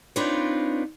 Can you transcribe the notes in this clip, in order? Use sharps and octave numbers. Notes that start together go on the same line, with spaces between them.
C4 D4 D#4 F4 B4 C#5